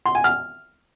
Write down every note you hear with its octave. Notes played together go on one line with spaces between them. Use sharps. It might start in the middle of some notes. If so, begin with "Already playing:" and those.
C6
G#5
F6